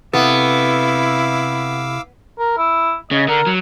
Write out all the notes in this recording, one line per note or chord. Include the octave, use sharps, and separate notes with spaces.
C3 B3 E4 A4 F5 D6 E6
A#4
E4
C#3 D#5
D3 A#4
F#3